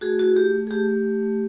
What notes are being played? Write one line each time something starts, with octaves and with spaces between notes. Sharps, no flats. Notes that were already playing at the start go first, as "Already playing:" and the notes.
A3 F#4 G#4
E4 F#4 G#4
A3 G4
A3
G#4
A3 G4
A3
A3
A3